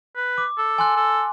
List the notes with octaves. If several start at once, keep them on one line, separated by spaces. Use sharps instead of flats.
B4
D6
A4
G#5 C6 F#6
A4